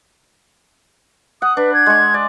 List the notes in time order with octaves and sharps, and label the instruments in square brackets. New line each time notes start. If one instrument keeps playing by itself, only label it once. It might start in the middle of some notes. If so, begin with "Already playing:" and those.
[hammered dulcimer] F#5 [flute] D#6
[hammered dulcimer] D4 [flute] B4
[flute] G#6
[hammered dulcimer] G#3 C#6
D5